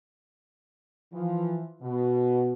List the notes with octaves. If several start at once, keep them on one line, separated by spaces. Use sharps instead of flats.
E3 F3
B2